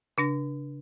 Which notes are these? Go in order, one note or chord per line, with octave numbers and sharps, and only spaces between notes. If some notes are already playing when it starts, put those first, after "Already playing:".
C#3 D4 A#6